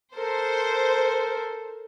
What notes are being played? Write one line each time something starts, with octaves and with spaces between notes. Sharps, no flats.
A4 A#4 C5